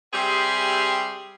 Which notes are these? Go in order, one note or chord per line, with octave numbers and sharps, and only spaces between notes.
G3 C4 G4 G#4 E5 C6